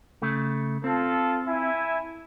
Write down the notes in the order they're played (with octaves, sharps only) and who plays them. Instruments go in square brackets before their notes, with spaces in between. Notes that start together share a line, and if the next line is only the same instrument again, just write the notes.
[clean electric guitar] C#3 A3
[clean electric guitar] C4 [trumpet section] F4 A4
[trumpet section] E4 E5 G#5